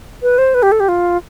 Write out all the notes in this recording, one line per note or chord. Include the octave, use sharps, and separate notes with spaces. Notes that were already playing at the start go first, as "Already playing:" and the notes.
B4
C5
B4
G4
A4
G4
F4